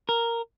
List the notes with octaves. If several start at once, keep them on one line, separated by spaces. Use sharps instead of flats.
A#4